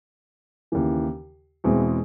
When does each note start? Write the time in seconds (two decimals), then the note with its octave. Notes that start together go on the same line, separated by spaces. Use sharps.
0.72 D#2 C#3 E3
1.64 E2 B2 G#3 C4 E4